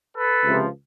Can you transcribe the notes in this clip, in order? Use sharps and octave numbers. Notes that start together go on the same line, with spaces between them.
A4 B4
C#2 C3 F3